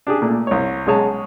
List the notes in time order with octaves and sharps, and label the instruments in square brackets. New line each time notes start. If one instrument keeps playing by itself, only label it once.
[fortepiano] D4 G4 G#4
A#2 A3
C2 C#5
B1 G#3 G#4 C#5 A5